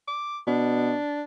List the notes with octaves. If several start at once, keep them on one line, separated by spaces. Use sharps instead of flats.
D6
B2 D4